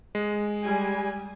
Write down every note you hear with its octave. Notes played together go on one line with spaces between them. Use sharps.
G#3
G3 G#5